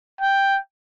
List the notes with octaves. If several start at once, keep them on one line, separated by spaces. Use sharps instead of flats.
G5